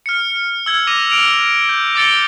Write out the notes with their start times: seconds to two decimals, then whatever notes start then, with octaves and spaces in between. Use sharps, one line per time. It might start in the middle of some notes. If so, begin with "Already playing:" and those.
0.06 F6 C#7
0.66 E6 G#6
0.87 D6 A#6 D#7 F7
1.10 F6 D7 F7
1.69 G6
1.95 D6 E6 A6 C#7 D7 G7